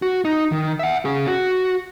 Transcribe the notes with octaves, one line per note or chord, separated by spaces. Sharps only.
F#4
D#4
D#3
E5 F#5
C#4 G#4
F#4